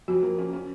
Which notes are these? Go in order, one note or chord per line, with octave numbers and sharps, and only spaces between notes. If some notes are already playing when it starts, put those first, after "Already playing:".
F2 F#4
A#3
C#4
C#4